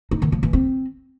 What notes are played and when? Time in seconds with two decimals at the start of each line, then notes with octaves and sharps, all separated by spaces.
0.11 D#4
0.22 D#3
0.32 F3
0.43 E3
0.53 C4